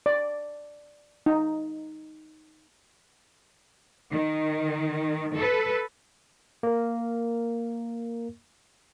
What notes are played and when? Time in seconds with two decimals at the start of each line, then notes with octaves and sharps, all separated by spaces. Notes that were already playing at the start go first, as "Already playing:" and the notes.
0.06 D5
1.26 D#4
4.12 D#3
5.36 A4 B4
6.63 A#3 A#4